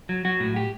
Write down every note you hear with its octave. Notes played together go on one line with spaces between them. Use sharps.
F#3
F#3 F#4
A2
G4